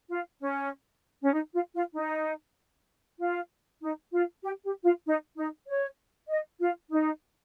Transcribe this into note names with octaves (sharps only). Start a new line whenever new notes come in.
F4
C#4
C#4
D#4
F4
F4
D#4
F4
D#4
F4
G4
G4
F4
D#4
D#4
C#5
D#5
F4
D#4